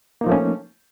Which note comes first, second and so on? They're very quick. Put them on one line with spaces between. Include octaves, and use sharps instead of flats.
A#3 D#4 F3 A3 C#4